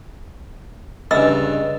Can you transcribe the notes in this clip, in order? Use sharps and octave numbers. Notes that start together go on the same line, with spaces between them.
G2 C#3 D#5 E6